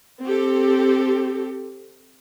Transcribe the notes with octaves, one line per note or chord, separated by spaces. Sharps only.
C4 G4 A4